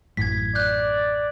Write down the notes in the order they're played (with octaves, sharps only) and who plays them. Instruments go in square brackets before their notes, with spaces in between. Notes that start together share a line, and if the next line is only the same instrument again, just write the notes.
[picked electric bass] A1 F#2 A2 [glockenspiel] G#6 B6
[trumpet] D5 [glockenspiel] F#6 G6